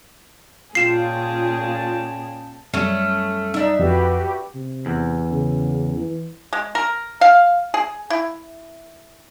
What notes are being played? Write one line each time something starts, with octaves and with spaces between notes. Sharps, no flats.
A#2 C#4 F4 G#4 G5 A5 C7 E7
F#2 G3 A3 C#4
D4 D#4 E5
F2 F#4 G4 B4
C3
E2
C#3
E3
G#3
A#4
F5
G#4
E4